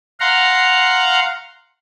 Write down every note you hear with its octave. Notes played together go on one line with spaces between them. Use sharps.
F5 F#5 A#5 C6